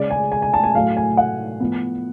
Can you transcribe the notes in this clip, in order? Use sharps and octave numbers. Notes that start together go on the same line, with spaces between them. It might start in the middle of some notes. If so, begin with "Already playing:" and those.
Already playing: C#3 G#3 C#4 D5
G#5
G#5
G#5
A5
G#5
A2 F#3 A3 F5
G#5
F#5
A2 F3 B3